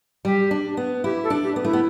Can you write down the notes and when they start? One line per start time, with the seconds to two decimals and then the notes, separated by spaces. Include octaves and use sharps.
0.25 G3 G4
0.51 D4
0.77 B3
1.04 E4 G4
1.23 A4
1.30 D4
1.43 G4
1.56 B3
1.63 A3 E4
1.73 B3